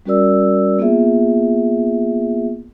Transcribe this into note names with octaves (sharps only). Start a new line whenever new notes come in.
G3 C#4 F#4 A#4 D5 E6
A#3 B3 F4 G#4 E5